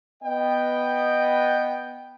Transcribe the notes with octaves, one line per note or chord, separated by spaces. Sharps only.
B3 D#5 G5